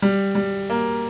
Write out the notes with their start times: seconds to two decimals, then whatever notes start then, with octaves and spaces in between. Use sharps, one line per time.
0.02 G3
0.35 G3
0.70 A#3